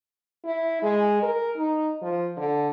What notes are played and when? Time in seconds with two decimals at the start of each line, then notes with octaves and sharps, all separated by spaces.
0.45 E4
0.83 G#3
1.23 A#4
1.57 D#4
2.02 F3
2.37 D3